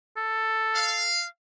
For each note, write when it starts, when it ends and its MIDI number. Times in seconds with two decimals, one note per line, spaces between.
0.17 1.11 69
0.75 1.24 77